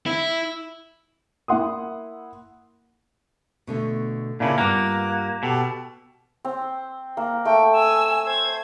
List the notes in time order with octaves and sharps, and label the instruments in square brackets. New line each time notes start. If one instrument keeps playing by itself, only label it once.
[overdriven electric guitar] E4
[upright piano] A#3 E4 E5 F#5 C6 D#6
[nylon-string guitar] B2 D3 A3
[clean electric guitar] A#2 C#3 [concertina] A#3 D4 E4
[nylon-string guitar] G2 B3 F4 [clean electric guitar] A#3 [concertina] F#5 [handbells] A#5 D6
[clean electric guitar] B2 [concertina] G4 A4
[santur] C4
A#3
[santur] A3 [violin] G5
[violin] G#5 E6
C5 G#6